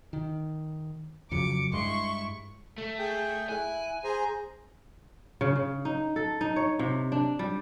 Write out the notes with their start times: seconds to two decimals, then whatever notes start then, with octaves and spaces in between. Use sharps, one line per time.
0.13 D#3
1.31 F2 C#3 F#3 D6 C#7
1.73 G2 G#3 E4 C6 C#6
2.78 A3
2.99 G#4 G5
3.49 E4 G#5 F#6
4.04 G#4 C5 A#5
5.41 C#3
5.56 C#3
5.85 D#4
6.16 A4
6.41 D#4
6.56 C#5
6.79 C3
7.12 D4
7.39 G3